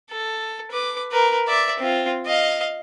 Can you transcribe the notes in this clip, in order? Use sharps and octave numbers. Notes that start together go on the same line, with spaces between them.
A4
B4 D6
A#4 B4
D5 E5
C4 F4
D#5 F5